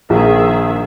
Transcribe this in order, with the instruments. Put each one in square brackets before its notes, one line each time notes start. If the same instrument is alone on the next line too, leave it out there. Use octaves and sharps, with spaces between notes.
[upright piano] A#1 [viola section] D#3 G#4 E5